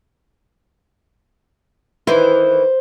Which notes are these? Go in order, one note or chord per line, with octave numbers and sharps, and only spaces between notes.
D#3 E3 E4 C5